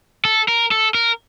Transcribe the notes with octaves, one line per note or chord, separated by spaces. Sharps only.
A4
A#4
A4
A#4